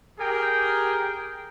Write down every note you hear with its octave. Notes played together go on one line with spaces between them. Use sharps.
G4 G#4 A#4 G5